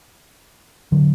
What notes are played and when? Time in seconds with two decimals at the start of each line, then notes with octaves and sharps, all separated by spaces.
0.92 D3 F#3